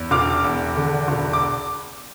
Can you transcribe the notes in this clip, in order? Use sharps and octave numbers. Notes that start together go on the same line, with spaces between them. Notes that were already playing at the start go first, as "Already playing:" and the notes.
Already playing: E2
E1 D6 F6
E2
D3
E1
D6